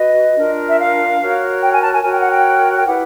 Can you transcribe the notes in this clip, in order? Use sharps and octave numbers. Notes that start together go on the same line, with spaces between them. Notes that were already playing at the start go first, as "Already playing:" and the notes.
Already playing: F#4 B4 D#5
D4 F4 A#4
E5
F5
F#4 A#4 C#5
G5
G#5
A5
G#5
F#4 A#4 C#5 G#5
G5
F#5
G5
G5
E4 G4 B4 F#5